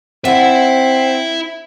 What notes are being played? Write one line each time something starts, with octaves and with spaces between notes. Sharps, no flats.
C4 E4 D5 E5 F#5